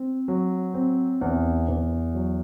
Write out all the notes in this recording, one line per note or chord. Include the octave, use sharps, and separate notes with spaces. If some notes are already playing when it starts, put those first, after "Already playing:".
Already playing: C4
F#3
C4
E2
E2
F#3